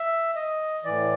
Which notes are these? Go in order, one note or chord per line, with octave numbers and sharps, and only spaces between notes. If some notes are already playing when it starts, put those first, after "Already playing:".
Already playing: E5
D#5
A2 E3 D5